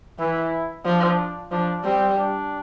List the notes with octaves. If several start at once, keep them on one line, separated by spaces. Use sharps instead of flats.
E3 E4
F3 D4
F3 D4
G3 C4
D4